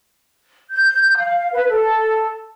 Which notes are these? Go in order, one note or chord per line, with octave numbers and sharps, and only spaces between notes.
G6
F5
B4
A4